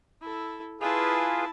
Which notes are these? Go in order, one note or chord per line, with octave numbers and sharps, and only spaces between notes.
E4 A4
E4 F4 G#4 B4 A5